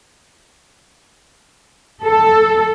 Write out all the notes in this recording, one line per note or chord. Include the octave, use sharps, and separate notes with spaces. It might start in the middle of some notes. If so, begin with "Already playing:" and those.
A4